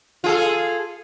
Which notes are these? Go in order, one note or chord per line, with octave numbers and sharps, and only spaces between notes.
F4 G#4 A4